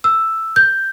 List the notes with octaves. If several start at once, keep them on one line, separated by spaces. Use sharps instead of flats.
E6
G6